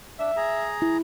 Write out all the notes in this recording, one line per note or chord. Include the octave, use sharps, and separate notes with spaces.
D4 E5
G#4 A#5
E4